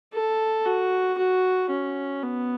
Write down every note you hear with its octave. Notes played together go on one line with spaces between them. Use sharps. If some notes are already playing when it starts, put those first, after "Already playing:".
A4
F#4
F#4
C#4
B3